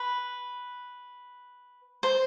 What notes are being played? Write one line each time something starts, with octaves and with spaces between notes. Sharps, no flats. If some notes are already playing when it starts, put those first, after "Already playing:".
Already playing: B4
C5